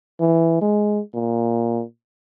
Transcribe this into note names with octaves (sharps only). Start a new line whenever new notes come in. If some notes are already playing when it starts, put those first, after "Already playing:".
E3
G#3
A#2